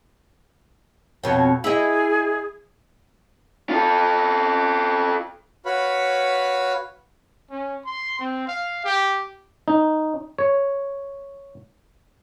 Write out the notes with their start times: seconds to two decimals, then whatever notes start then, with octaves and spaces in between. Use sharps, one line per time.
1.23 F2 B2 C#5
1.64 E4 G#4 D#5
3.70 F4 A4
5.66 F#4 B4 C#5 F5 B5
7.50 C#4
7.86 C6
8.19 C4
8.48 F5
8.84 G4
9.68 D#4
10.38 C#5